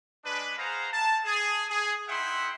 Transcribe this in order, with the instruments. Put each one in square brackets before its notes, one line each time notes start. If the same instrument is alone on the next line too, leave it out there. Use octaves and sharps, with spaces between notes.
[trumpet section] G#3 D4 B4
G#4 C5 F5 F#5 A#5
A5
G#4
G#4
D#4 E4 E5 F#5 G5 C6